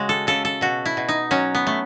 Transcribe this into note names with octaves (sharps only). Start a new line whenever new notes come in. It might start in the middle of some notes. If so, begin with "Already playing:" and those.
Already playing: C#3 G#3 C#4 F#4
A4
C#3 A4
A4
B2 F#4
E4
B2
D#4
F#3 C#4
B3
A3